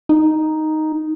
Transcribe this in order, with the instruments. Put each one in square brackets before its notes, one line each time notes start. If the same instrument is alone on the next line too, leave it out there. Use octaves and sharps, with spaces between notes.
[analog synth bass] D#4